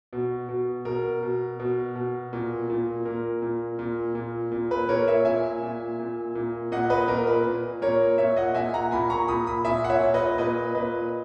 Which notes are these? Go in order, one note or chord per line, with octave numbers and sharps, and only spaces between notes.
B2
B2
B2 A#4
B2
B2
B2
A#2
A#2
A#2 A#4
A#2
A#2
A#2
A#2
B4
A#2 A#4 C#5
C#5 E5
A#2 E5 G#5
A#2
A#2
A#2
A#2 D#5 F#5
B4 D#5
A#2 A#4
B4
A#2
A#2 A#4 C#5
A#2 C#5 E5
D#5 F#5
A#2 E5 G#5
F#5 A#5
A#2 G#5 B5
A#5 C#6
A#2 B5 D#6
B5 D#6
A#2 E5 G#5
F#5
C#5 E5
A#2
B4 D#5
A#2 B4 D#5
A#2 B4 D#5